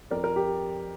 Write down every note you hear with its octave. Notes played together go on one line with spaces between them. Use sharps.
F2 A#4 D5
A#4
G4